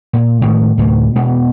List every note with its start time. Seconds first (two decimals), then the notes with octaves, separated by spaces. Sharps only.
0.13 A#2
0.42 A2 D#3 G#3
0.78 D2 A2 C3
1.15 B2 G#3 B3